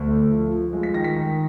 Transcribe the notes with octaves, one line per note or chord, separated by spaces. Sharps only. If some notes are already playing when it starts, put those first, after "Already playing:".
Already playing: D2
A3
F3
F3
G#3
B6
D#3 A#6
B6
D#3